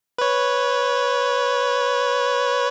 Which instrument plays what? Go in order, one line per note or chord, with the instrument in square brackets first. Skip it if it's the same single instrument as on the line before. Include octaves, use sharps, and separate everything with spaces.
[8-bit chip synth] B4 C#5